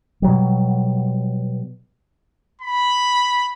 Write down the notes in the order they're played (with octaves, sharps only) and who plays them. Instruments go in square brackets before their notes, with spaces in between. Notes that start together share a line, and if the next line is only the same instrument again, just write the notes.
[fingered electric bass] B2 F#3 G3
[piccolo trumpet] B5